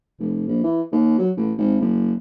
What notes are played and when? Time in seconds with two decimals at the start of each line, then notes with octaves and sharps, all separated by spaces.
0.18 F1
0.47 A#1
0.63 E3
0.92 D#2
1.18 F#3
1.37 A1
1.58 G#1
1.80 F#1